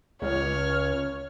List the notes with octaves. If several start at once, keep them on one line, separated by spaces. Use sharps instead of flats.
C#2 C#5 F6